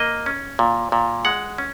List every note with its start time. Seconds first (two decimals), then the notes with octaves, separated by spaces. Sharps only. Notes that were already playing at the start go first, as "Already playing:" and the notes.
Already playing: A#3 D#5
0.26 C#4
0.59 A#2
0.92 A#2
1.25 G#3 F#5
1.58 C#4